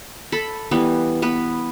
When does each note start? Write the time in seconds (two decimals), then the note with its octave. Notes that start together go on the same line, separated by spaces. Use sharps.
0.32 A4 B5
0.71 E3 G3 B3
1.22 B3 B4